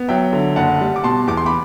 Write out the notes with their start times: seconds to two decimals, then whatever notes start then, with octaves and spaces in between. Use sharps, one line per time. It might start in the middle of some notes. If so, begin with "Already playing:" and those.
Already playing: B3
0.09 F#3 E5 G5
0.33 D3
0.56 F#1 F#5 A5
0.81 G3
0.96 D6
1.04 B2 A5 C6
1.27 E2 D6
1.37 C6
1.46 B5 D6